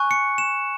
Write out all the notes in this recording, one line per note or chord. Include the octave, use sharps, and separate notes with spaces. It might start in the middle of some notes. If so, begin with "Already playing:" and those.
Already playing: G#5 C#6 F#6
C#7
E7